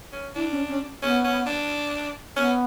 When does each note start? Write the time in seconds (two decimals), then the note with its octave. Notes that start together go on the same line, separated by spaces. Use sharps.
0.13 C#4
0.35 D4 E4
0.52 C#4
0.69 C#4
1.03 B3 C#4
1.24 C#4
1.47 D4
2.37 B3 C#4